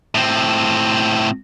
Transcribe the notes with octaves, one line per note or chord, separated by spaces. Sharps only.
A2 C4